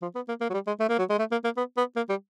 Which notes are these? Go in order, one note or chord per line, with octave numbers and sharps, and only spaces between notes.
F3
B3
A#3
A#3
F#3
G3
G#3
A3
A#3
F#3
G#3
A3
A#3
A#3
B3
B3
A#3
G3